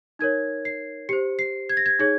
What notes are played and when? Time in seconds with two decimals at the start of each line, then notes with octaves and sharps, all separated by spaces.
0.19 D#4 A#4 C#5 G#6
0.65 C7
1.09 G4 C5 C#7
1.39 C7
1.69 G#6
1.77 A#6
1.86 G#6
1.99 D#4 G#4 C#5 G#6